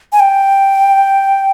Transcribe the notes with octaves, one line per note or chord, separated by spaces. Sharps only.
G#5
G5